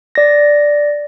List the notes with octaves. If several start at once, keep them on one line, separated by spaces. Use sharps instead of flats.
D5 A#6